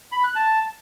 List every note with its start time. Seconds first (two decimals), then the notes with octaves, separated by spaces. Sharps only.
0.12 B5
0.24 F#6
0.35 A5